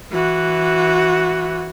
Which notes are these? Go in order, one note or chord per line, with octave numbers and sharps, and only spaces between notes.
E3 F#4